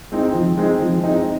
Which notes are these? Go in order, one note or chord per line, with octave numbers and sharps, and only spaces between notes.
G#3 C4 D#4
F3
G#3 C4 D#4
F3
G#3 C4 D#4